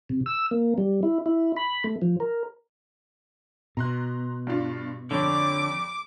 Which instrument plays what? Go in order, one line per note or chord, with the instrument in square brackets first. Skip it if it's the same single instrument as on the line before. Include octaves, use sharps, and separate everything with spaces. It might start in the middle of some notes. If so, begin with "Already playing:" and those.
[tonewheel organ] C3
E6
A#3
G3
E4
E4
B5
A3
F3
A#4
[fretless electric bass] B2 [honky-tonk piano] A#5 C6 F#6
[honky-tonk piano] G2 D4 F4
[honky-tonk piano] F2 C#5 D5 [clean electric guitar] D3 [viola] D6